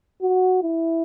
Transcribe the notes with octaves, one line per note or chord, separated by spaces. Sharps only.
F#4
E4